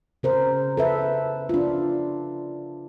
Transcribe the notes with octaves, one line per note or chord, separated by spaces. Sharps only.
C#3 A#4 C5
A4 B4 E5
D4 F4